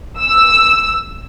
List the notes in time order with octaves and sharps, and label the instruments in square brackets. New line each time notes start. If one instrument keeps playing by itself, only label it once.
[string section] E6